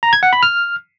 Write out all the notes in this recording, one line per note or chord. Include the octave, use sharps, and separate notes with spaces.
A#5
G#6
F#5
B5
F6